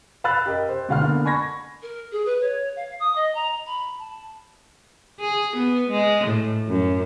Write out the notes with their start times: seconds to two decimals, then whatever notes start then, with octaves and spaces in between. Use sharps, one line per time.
0.24 F5 B5 E6 F#6 A6
0.46 G4 A#4 D#5
0.69 C5
0.88 D2 B2 G#3 F5 F#5 F6
1.02 D3 A#3 B3
1.25 G#5 B5 C#6 G#6 A#6
1.82 A#4
2.12 G#4
2.25 B4
2.41 C#5
2.76 F5
2.99 D#6
3.15 D#5
3.34 A#5
3.66 B5
3.98 A5
5.20 G#4
5.57 B3
5.90 G#3
6.27 A2
6.68 F#2